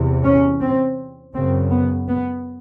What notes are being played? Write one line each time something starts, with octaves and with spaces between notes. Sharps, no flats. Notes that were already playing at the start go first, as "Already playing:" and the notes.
Already playing: E2 C3
C#4
C4
F#2 C#3 C4
B3
B3